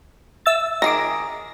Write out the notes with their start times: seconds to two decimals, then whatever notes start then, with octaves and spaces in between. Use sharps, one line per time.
0.46 E5 E6 A6
0.82 D#3 G#4 D6 A#6